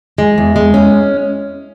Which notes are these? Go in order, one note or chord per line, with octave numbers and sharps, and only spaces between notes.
G#3
E2
G#3
C#4